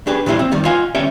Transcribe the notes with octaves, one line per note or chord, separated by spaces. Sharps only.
D4 G4 G#4 B4
A#2 E3 G3 E4 G4 C5
C4
E2 D#3 G3
F4 D#5 F5 F#5 G#5
D2 G3 C#4 C#5 E5 G5